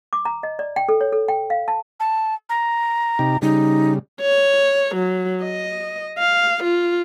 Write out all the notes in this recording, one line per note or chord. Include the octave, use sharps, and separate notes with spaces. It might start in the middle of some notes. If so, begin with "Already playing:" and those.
D6
A#5
D#5
D5
G5
A4
C#5
A4
G5
F5
A5
A5
A#5
C3 D#4 G4
C#3 G3 D#4
C#5
F#3
D#5
F5
F4